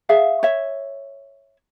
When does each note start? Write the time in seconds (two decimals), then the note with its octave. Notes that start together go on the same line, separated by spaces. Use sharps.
0.09 G#4 E5 F5
0.43 C#5 E5